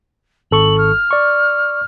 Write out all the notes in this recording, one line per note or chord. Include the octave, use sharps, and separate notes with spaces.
G#1 A4 C#6 F#7
F6
D5 C#6